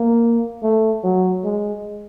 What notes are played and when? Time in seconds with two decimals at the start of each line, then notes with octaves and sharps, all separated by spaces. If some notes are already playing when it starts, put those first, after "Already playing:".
Already playing: A#3
0.63 A3
1.04 F#3
1.44 G#3